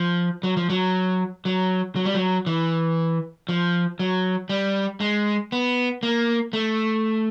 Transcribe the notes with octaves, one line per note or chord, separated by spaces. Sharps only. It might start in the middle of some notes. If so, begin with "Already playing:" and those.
Already playing: F3
F#3
F3
F#3
F#3
F#3
G3
F#3
E3
F3
F#3
G3
G#3
B3
A#3
A3